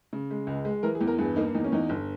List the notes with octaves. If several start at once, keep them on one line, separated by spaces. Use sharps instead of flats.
C#3
G#3
C#2
G#3
E3 A#4
G#4
E2
A#4
G2 G#4
A#3 D#4
E2 D#4
C#4
E2 D#4
G1